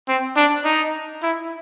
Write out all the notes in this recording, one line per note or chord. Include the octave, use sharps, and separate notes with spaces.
C4
D4
D#4
E4